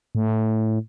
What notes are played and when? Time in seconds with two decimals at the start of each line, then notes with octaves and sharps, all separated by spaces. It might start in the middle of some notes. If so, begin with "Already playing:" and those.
0.15 A2